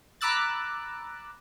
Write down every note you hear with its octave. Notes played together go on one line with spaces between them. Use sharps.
A#5 B5 D6 E6 F#6 A6